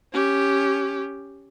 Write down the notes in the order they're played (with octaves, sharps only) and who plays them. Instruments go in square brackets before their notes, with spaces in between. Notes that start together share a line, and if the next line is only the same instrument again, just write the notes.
[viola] C#4 G4